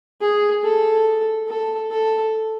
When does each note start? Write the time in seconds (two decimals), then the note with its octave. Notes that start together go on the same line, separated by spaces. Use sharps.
0.21 G#4
0.64 A4
1.48 A4
1.91 A4